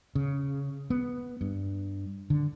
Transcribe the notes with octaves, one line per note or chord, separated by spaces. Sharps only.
C#3
B3
G2
D3